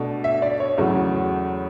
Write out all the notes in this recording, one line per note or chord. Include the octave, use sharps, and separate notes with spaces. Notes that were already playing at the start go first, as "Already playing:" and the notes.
Already playing: B2 A3 D4
E5
D5
C#5
E2 C#3 F#3 A3